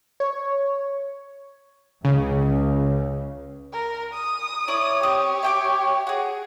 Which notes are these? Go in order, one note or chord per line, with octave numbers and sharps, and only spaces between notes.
C#5
C#2 C#3
A#4
D#6
E4 C#5 D5 D6
C4 G4 D#6
E5 G5 D6
F#4 G#4